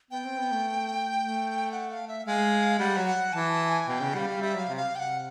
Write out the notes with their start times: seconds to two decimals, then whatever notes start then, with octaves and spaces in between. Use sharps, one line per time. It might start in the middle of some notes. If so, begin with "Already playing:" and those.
0.11 B3 G5
0.24 C4
0.37 B3
0.51 A3
1.19 A3
1.72 F#5
1.91 F5
2.08 E5
2.26 G#3 F5
2.79 G3 F#5
2.97 F#3
3.06 F#5
3.33 E3 A5
3.51 A5
3.69 G#5
3.87 B2 G5
4.01 C#3
4.14 G3 F#5
4.18 F5
4.27 G3
4.41 G3 E5
4.55 F#3 F5
4.68 C3
4.77 F5
4.94 C3 G5
4.99 F#5